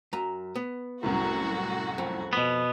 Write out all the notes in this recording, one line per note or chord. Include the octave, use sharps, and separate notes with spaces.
F#2 A#5
B3
C2 F#2 A2 F#4
F2
B2 B3